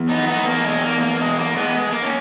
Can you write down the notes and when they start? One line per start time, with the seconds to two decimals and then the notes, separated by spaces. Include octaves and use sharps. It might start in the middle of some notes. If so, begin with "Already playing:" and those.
Already playing: E2
0.09 B3 D#4
0.28 B3 D#4
0.46 A#3
0.64 G#3
0.83 A#3
1.01 A#3
1.20 G#3
1.38 A#3
1.57 G#3 B3
1.75 G#3
1.92 A#3
2.03 C#4